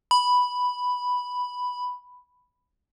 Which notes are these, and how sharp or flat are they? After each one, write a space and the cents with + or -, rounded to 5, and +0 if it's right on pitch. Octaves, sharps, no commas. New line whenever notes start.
B5 +0